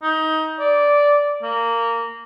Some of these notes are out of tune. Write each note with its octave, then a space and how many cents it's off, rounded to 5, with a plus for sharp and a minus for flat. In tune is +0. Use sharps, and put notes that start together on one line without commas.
D#4 +20
D5 -10
A#3 -15